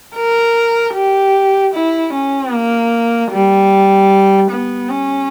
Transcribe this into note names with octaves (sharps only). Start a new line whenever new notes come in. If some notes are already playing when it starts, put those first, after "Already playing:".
A#4
G4
E4
C#4
A#3
G3
B3
C#4